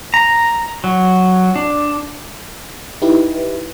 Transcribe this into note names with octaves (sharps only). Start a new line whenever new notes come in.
A#5
F#3
D4
D#4 E4 G4 B4